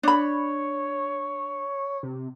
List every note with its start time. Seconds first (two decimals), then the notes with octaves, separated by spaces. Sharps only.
0.03 D4 C#5 B5
2.03 C3